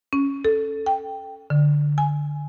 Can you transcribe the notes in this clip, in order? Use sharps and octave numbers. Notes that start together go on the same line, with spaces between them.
C#4
A4
G5
D3
G#5